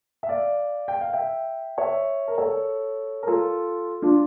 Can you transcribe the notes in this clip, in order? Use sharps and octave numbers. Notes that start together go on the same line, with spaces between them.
E5
D5 F5
G5
F5
E5 G5
C#5 E5
A#4
A4 C#5
A#4
F4 A4
D4 F4